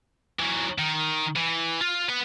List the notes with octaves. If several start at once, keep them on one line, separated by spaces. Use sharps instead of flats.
E3 F#3
D#3
E3
F4
B4 F#5